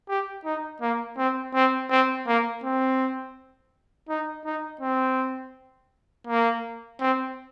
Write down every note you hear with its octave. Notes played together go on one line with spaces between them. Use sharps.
G4
D#4
A#3
C4
C4
C4
A#3
C4
D#4
D#4
C4
A#3
C4